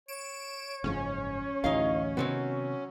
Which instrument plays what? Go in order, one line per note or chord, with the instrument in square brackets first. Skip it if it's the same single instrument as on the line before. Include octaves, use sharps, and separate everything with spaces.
[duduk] C#5 [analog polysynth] D7 E7
[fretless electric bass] F#1 G#2 F3 [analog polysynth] C#4
[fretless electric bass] A1 D2 E3 [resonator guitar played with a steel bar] D#4 D#5 F5
[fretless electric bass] C3 D#3 B3 [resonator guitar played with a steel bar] F#3 C4 F#4